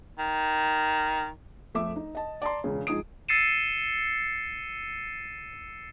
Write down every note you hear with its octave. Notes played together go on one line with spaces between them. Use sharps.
D#3
F2 A3 E5 D6
D#4
D#5 A5
D5 A5 A#5 C6
E1 C#2 C#3
G#2 F3 D#4 G#4 D#6 D7
E6 A6 C7 C#7 D#7 E7